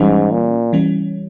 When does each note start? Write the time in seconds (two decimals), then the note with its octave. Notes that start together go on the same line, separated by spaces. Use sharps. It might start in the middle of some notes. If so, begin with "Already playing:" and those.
Already playing: G#2 E3 G3 C#4
0.31 A#2
0.73 E3 G3 C#4